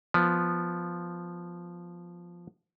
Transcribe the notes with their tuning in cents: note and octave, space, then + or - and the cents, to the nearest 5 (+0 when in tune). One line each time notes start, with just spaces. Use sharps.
F3 +0 B3 +0